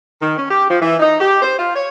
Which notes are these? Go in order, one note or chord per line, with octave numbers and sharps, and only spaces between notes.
D#3
C#4
G4
F3
E3
D#4
G4
C5
F4
C#5